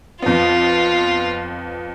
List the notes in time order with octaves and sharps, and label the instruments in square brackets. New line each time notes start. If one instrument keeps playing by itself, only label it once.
[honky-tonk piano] F2 B3 [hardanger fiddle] F4